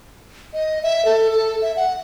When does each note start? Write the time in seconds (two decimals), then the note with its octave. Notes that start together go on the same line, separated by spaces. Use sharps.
0.54 D#5
0.83 E5
1.05 A4
1.32 A4
1.61 E5
1.76 F#5